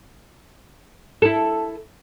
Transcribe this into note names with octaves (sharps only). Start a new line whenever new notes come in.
E4 A4